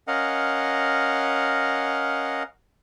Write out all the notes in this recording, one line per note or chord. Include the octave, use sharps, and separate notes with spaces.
C#4 A#4 D#5 F5 F#5